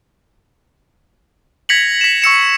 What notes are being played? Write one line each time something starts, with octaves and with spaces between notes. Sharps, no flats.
G#6 A#6 B6 C#7 F7 F#7
B6 E7
C#6 E6 C#7 E7